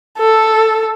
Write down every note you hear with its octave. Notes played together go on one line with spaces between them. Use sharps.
A4